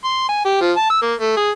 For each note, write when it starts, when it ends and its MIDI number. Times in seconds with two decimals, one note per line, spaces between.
0.05 0.24 84
0.29 0.43 80
0.45 0.59 67
0.61 0.72 53
0.77 0.88 81
0.90 0.98 88
1.02 1.14 58
1.19 1.34 57
1.37 1.50 68